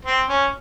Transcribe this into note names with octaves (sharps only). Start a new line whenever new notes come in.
C4
C#4